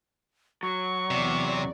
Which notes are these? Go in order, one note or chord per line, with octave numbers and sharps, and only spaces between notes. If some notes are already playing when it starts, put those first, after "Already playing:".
F#3 C#6
E2 C3 D5